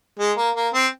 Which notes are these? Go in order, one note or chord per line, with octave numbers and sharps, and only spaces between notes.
G#3
A#3
A#3
C4